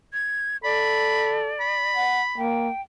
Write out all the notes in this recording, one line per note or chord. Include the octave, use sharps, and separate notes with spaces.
G#6
A4 D5 B5
B5
F#5
A#3 G5